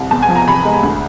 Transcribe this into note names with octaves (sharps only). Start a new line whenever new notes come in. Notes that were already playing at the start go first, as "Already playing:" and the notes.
Already playing: C2
E2 A5
G#5
F3
A#5
C3 B5
G#3
D2